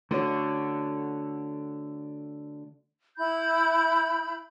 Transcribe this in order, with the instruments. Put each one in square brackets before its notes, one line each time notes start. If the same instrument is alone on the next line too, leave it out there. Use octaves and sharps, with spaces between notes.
[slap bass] D3 [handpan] A3 F#4 C#5
[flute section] E4 B5 G6